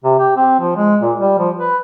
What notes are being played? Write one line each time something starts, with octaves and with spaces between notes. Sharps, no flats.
C3
G4
C4
F3
G#3
A#2
G3
F3
B4